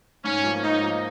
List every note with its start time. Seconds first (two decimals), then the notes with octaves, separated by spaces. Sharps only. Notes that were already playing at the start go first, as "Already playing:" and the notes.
0.24 G#2 C#4
0.44 F3 A#3
0.63 G#2 D#4
0.82 F3 A#3